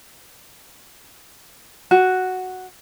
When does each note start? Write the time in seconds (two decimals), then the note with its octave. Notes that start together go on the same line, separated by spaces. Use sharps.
1.91 F#4